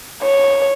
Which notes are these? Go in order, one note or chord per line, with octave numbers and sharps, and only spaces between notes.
C#5